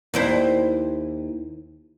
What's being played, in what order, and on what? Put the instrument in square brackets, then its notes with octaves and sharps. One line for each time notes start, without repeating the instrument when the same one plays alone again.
[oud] D#2 E4 C5